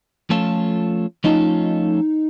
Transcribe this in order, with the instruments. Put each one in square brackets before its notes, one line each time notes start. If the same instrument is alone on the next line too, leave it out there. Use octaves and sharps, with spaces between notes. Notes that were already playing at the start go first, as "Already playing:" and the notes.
[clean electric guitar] F3 A3 C#4 F4 A4
[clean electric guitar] F3 A3 C#4 F4 A4 [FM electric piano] D#4